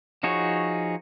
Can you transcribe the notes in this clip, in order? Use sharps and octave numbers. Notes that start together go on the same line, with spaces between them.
F3 D#4 F#4 G#4 C#5